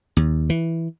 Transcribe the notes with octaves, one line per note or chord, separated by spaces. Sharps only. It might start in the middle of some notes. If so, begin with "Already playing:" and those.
D#2
E3